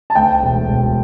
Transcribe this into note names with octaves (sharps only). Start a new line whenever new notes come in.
A5
D2 G5
E1
E1